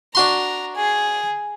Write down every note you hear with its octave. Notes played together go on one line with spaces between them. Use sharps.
D4 F#4 A#5 C6
G#4